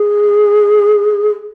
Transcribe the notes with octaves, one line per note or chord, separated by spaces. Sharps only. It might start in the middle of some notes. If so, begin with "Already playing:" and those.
Already playing: G#4